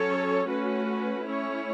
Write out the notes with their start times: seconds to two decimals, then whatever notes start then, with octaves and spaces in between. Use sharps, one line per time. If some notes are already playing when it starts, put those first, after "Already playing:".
Already playing: F#3 C#4 A4 C#5
0.47 A3 C#4 F#4 B4
1.24 A3 C#4 E4 C#5